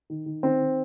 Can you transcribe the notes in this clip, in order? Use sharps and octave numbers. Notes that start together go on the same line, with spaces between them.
D#3
D#3
D#3 C4
D#3